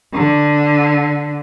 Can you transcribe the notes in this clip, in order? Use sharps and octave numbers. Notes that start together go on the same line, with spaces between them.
D3